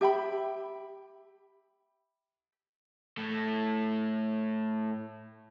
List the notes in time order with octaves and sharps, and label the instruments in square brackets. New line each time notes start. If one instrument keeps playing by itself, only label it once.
[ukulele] G4 E5 G5 B5
[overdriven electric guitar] A2 A4